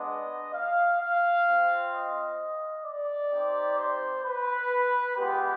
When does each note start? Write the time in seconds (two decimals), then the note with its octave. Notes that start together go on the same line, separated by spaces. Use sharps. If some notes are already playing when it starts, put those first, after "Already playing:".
Already playing: G#3 B3 D4 D#5
0.54 F5
1.01 F5
1.47 C4 F4
1.93 D#5
2.85 D5
3.32 C4 D#4 G4
3.78 C5
4.25 B4
5.17 G#3 B3 F4 G4